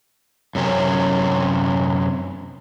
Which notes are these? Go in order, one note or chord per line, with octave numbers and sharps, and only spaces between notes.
F#2 C3 C#4